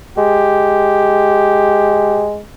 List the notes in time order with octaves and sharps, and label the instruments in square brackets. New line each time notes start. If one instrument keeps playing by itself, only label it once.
[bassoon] G#3 [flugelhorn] G4